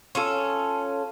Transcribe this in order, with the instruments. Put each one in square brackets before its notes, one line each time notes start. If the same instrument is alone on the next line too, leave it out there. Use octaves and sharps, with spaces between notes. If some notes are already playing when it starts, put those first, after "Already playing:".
[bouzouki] C#4 F4 A4